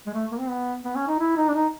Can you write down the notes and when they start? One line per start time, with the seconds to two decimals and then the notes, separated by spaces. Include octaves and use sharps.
0.06 G#3
0.13 A3
0.31 A#3
0.40 C4
0.49 B3
0.84 B3
0.95 C#4
1.08 D#4
1.20 E4
1.37 D#4
1.48 D4
1.54 D#4